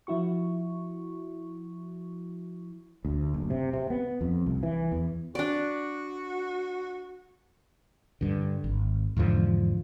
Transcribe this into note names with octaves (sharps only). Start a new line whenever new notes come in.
F3 E4 F#4 C#6
D2
F#1
C3
C3
B3
F2
C2
E3
E2
D4 F#4 D5
G2 D3
G#1
E2 G#2 D3 F3